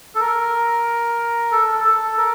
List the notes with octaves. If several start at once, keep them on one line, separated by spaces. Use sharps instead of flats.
A4
A#4
A4
A4
A#4